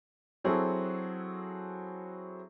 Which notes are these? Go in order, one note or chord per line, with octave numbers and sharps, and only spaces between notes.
F#3 C4 E4 F#4 G#4 A4